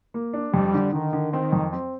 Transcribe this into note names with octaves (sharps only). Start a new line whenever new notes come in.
A#3
D4
F2 G3
D3
D3 D#3
D3
D#3 C4
F2
C4